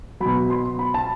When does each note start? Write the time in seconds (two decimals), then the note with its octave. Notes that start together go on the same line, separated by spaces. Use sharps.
0.20 F#3 B5
0.26 B2
0.50 C6
0.79 B5
0.94 A5